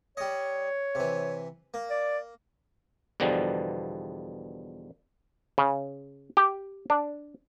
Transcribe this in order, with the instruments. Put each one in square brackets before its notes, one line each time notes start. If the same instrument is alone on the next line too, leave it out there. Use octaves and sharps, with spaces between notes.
[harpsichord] G3 D#5 [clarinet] C#5
[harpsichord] C3 E3
A#3
[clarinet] D5
[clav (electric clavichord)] E2 B2 D3 F3 G3
C#3
G4
D4